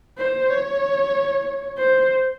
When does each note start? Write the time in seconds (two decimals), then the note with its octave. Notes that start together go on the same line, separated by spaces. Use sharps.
0.18 C5
0.50 C#5
1.78 C5